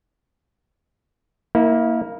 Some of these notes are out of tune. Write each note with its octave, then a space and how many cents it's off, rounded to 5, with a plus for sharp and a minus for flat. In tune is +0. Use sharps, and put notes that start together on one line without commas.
A#3 +0 E4 -30